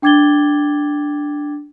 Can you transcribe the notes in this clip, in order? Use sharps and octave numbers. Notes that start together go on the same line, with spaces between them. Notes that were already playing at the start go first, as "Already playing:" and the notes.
D4 G5 D6 G#6 A6 G7